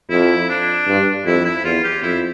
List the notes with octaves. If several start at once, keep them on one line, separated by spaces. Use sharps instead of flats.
F2 E4
D4
G2
F2 E4
E4
E2 F4
G4
F2 E4